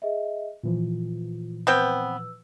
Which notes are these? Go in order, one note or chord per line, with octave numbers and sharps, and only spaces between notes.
G#4 D#5 E5
A#2 E3 F3 F4
B3 C4 B4 G5 E6